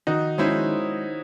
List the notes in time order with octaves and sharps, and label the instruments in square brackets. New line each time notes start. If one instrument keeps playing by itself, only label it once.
[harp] D#3 [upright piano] D#4 F#4
[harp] G#3 D#4 F#4 C5 [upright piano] C#4 E4